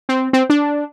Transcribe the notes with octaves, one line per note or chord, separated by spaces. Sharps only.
C4
C4
D4